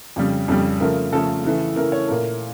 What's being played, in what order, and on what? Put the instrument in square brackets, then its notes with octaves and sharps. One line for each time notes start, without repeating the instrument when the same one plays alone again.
[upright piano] F2 C#3 G3
F2 C#3 G3
C#3 F3 A3 A#4
C#3 F3 A3 A4
C#3 E3 A3
C#3 E3 A3 A#4
C#5
A#2 A3 A#4